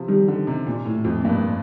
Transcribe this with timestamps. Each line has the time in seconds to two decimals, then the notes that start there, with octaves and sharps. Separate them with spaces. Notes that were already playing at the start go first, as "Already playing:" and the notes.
Already playing: C3 F3
0.08 D#3 G3
0.28 D3
0.47 C3
0.67 A#2
0.85 A2
1.04 F2
1.24 G2 A#3